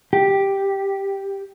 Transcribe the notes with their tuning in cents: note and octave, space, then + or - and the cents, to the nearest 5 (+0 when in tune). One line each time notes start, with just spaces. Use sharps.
G4 +0